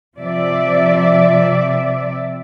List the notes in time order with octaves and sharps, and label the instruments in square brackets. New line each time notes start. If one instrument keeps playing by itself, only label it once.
[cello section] C3 F3 D5 E5